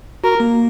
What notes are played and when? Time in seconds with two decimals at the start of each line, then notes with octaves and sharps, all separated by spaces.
0.24 F#4 A#4
0.40 A#3